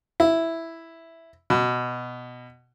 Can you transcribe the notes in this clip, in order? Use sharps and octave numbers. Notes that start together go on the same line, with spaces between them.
E4
B2